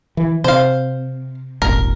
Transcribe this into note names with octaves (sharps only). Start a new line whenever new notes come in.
E3
C3 C5 F5
D#1 G#1 A#4